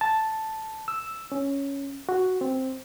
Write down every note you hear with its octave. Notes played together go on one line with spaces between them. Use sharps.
A5
E6
C#4
F#4
C4